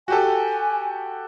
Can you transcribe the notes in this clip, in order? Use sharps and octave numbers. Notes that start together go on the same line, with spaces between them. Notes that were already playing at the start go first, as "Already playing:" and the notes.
F#4 G4 A4 G#5